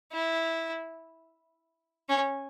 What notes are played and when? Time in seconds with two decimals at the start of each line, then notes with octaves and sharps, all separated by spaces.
0.12 E4
2.09 C#4